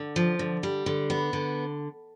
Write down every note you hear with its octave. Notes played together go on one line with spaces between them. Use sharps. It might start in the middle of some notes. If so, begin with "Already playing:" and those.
Already playing: D3
F3
D3
G3
D3
B3
D3